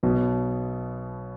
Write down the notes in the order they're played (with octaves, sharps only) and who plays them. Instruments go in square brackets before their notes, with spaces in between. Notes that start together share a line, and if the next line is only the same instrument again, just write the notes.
[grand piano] B1 B2